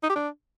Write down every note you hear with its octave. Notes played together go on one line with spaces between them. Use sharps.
D#4
G4
D4